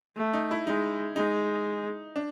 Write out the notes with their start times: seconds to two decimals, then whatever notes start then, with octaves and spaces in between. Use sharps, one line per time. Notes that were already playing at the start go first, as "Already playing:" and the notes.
0.17 A3
0.33 D#4
0.51 E4
0.67 G#3 D#4
1.16 G#3 D#4
2.16 D4